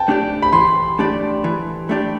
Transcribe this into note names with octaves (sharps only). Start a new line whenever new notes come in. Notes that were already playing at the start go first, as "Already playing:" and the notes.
Already playing: G5 A5
A3 D4 G4 D5
B5
E3 C6
A3 D4 G4 D5
E3
A3 D4 G4 D5